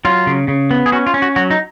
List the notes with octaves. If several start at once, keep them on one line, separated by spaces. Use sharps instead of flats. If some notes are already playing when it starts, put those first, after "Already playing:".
F#3 F4
C#3
C#3
B3
G#4
C#4 F#4
F4
C#4
F#4
F#3 F#4
D#4